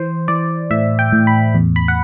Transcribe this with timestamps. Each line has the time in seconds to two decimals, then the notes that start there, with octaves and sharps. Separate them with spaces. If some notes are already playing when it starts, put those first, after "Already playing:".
Already playing: E3 C5
0.28 E3 D5
0.71 A2 E5
0.99 G5
1.13 A2
1.27 B5
1.55 E2
1.76 B5
1.88 F#5